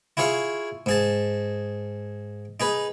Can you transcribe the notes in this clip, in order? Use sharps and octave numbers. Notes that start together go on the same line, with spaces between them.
E4 F4 G#4 C#5 F5 C#6
G#2 G#4 A5
D#4 G#4 B4